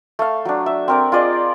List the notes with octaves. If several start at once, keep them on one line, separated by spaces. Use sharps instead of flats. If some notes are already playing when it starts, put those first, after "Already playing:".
A3 F5
F#3 D4
E5
C4 A#4 D5
F4 G#4 D5 D#5